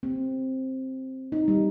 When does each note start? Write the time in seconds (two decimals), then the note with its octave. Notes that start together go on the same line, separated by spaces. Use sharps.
0.03 C4
1.32 D#4
1.48 G3